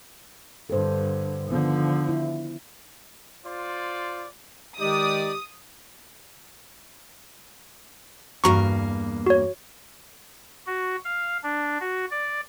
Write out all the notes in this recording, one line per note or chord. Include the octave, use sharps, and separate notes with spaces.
G2 D3 A4 C5
D3 D#3 F3 B3
E4
F4 C5 D5
D#3 G#3 D#4 G4 D5 D#6
E2 G2 A#3 F#4 A#5 C#6
F#4 C#5
F#4
F5
D4
F#4
D5